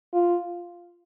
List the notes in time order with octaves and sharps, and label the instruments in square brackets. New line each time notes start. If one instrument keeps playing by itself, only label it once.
[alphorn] F4